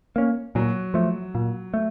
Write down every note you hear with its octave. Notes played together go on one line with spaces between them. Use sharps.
A#3 C#4
A#2 F#3
F3 A3
A#2
A3